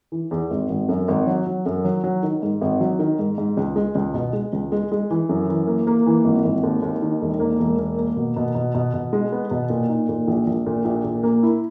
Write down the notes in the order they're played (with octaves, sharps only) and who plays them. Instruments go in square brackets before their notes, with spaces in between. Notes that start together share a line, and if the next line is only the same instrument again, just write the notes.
[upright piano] E3
E2
G#1
G#1
F#2
G#1
F#3
F#3
F#2
F#3
F#3
D#3
G#2
G#1
F#3
D#3
G#2
G#2
C#2
G#3
C#2
B2
G#3
C#2
G#3
G#3
E3
F#2
E3
A#3
A#3
E3
G#1
G#1
D#2
D#2
D#3
E1
A#3
E1
A#3
A#3
B2
B2
B2
B2
B2
G#3
B3
B2
A#2
D#4
A#2
A#1
A#1
A#2
A#1
A#2
A#3
E4